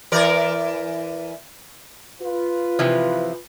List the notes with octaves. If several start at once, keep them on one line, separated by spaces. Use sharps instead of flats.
E3 A#4 D5
F4 B4
C3 E3 F3